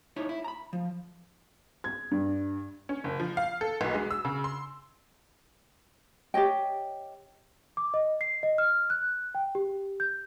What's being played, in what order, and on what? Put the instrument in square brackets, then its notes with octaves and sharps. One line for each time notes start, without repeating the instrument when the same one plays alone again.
[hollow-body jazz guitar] D#4 E4 C#5
E4
A#5 B5
F3
[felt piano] G#6
G2
[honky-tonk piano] C#4
F#1
F3
F5
A4
B1
G#3
E6
C#3
C6
[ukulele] G4 C#5 D#5 G5
[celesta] D6
D#5
C7
D#5
F6
F#6
G5
G4
G6